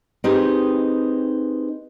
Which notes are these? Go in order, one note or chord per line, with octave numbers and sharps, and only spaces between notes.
C4 D#4 G4 G#4 B4 D#5